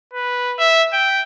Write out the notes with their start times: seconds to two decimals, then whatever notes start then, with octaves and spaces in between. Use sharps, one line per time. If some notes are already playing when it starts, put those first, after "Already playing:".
0.13 B4
0.59 E5
0.93 G5